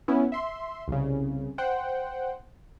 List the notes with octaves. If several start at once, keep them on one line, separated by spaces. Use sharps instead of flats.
B3 C#4 E4
E5 C6
C2 C#3
C5 F#5 G5